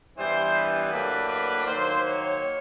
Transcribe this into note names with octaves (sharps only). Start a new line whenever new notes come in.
G2 E3 G3 B3 C5
B4
A2 F#3 A#3 D4
B4
D#3 F#3 A#3 C5
C#5